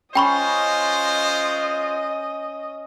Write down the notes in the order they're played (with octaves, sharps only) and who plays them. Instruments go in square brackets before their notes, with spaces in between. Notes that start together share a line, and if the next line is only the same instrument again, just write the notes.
[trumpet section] G#3 F4 C5 [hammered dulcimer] C#4 [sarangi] D#5 [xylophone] G5 B5 C#6